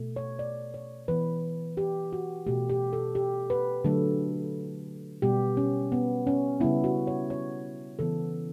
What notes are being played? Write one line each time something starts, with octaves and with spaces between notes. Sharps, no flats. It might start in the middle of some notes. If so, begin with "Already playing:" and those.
Already playing: B2 A3
C#5
D5
C#5
E3 B3 B4
G4
F#4
B2 A3 G4
G4
A4
G4
B4
D3 F#3 A3 A4
B2 G3 B3 G4
C#4
B3
C#4
C#3 G3 B3 E4
F#4
C#5
C#5
C#3 E3 B3 A4